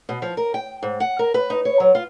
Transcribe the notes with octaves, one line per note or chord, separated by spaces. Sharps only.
B2
F3
A#4
G5
G#2
F#5
A#4
B4
D#4
C#5
F#3
F4